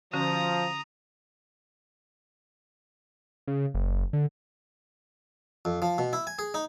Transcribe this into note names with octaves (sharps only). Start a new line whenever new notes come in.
D3 F3 C#4 F#4 A#5 D#6
C#3
F#1
D3
F2
F3
B2
E4
G#5
G#4
D#4